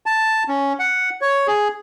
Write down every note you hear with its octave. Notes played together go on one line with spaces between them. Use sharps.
A5
C#4
F#5
C#5
G#4